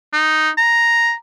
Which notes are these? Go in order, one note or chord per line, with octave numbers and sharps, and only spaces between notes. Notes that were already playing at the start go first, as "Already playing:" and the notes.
D#4
A#5